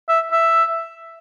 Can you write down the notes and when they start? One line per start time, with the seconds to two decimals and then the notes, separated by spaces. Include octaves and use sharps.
0.09 E5
0.32 E5